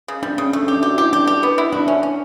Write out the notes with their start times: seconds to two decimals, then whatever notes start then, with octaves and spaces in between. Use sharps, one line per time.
0.08 C#3
0.23 G3 D4
0.38 C#3 C#4
0.53 A3 D4
0.63 C#4
0.68 G4
0.73 D4
0.83 F#4 G4
0.97 E4 G4
1.13 D4 G4
1.27 G4
1.43 B3
1.58 E4
1.72 D4 F#4
1.88 C#4
2.03 C#4